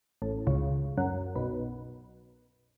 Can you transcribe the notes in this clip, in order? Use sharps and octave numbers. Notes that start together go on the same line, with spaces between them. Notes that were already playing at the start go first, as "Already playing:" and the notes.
A1 A2
C#2 C#3
F#2 F#3
B1 B2